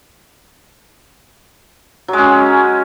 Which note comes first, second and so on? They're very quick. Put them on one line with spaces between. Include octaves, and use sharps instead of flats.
F#3 G#3 C#4